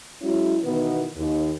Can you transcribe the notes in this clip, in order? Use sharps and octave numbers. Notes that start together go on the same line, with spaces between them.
F#3 G#3 C#4 E4
B2 D#3 E3 B3
D#2